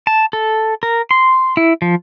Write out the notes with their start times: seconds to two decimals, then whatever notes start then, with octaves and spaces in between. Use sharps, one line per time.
0.07 A5
0.33 A4
0.83 A#4
1.11 C6
1.57 E4
1.82 F3